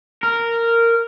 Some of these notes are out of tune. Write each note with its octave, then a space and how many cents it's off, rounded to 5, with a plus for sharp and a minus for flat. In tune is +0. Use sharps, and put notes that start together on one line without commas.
A#4 -10